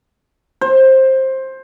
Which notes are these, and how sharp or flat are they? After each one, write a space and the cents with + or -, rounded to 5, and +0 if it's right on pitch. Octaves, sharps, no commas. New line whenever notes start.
C5 +15